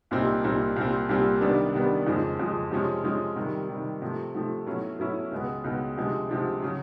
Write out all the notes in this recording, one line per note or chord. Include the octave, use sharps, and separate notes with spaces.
C2 A#2 G3 C4 D#4
C2 A#2 G3 C4 D#4
C2 A#2 G3 C4
C2 A#2 G3 C4
C3 D#3 G3 B3 D4
C3 D#3 G3 B3 D4
F2 C#3 F3 G#3
F2 C#3 F3 G#3
C3 F3 G#3 C#4
C3 F3 G#3 C#4
C3 D#3 G3
C3 D#3 G3
C3 F3 A3
C3 F3 A3
B2 F#3 A3 C#4 E4
B2 F#3 A3 C#4 E4
C#2 B2 G#3 B3
C#2 B2 G#3 B3
D2 C3 F3 G#3
D2 C3 F3 G#3
C#3 F#3